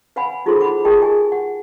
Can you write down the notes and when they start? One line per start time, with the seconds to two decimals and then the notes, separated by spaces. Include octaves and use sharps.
0.16 B4 F5 F#5 G#5 B5
0.46 D#4 F4 G#4 A4 C5 C6
0.60 E4 F#5 B5 D6
0.85 G4 G#4 A#4 D#5 G5 A5
1.02 G#4 D#5 G#5
1.32 F#5